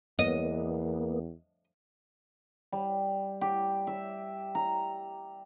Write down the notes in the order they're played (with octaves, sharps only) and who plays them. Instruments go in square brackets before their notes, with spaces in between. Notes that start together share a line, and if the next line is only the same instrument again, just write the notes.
[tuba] E2 [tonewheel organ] A#3 B3 [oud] D#5
[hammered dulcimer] G3
G4
E5
A#5